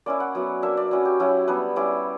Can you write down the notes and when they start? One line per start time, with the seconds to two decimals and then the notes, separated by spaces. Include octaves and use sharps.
0.06 A#3 C#4 E4 D5
0.20 F#5
0.35 F#3 B3 E4
0.62 A#3 D4 E5
0.77 D5
0.91 F#3 C#4 E4
1.05 G4
1.20 F#3 C#4 E4
1.48 G3 B3 D4 B4
1.76 G3 C#4 E4 D5